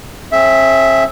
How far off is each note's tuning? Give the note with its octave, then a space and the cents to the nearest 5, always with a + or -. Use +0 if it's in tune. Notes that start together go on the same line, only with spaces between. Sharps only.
C4 +45 G#4 +30 E5 +0